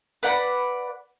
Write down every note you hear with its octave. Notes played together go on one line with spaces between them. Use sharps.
B4 D5 F#5 B5